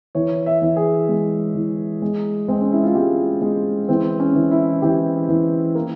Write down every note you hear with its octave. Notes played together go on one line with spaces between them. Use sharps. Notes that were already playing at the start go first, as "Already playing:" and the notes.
E3 C#5
E5
E3
G#4
G#3
E3
G#3
G#3 C4
C#4
E4
F4
G#3 G4
G#3
E3 C4
C#4
E3
E4
E3 G4
E3
A#3